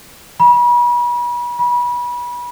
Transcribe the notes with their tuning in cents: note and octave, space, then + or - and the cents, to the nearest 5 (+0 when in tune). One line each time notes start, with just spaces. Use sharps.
B5 -40
B5 -30